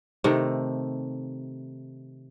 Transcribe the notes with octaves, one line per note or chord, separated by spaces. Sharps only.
C3 D#3 A3